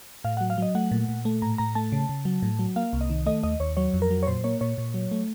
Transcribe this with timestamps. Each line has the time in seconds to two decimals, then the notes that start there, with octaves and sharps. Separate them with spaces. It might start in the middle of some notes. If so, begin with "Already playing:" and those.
0.24 A2 F5
0.37 F#3 F#5
0.50 F5
0.58 F#3 D#5
0.75 A3 F#5
0.91 A#2
1.09 A#2
1.25 A3
1.42 A2 A#5
1.58 A2 A#5
1.75 A3 A5
1.92 C#3
2.09 C#3
2.25 F#3
2.42 A2
2.59 F#3
2.76 A#3 F5
2.93 C2
3.01 D#5
3.10 D#3
3.26 A3 D#5
3.43 D#2 D#5
3.60 D#2 C#5
3.77 F#3 C#5
3.94 F2
4.02 A#4
4.10 F#3
4.23 C#5
4.27 A#2 C5
4.44 A#3 C#5
4.61 A#2 C#5
4.78 A#2
4.94 F#3
5.11 A3